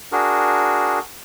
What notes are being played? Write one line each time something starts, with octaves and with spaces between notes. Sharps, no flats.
D4 F#4 G#4 A#4